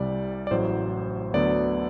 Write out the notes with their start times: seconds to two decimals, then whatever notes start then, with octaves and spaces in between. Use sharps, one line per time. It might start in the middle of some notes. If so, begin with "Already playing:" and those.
Already playing: C2 C3 G3 D5
0.47 D5
0.51 A1 A2 F#3 C5
1.33 D2 D3 F#3 B3 D5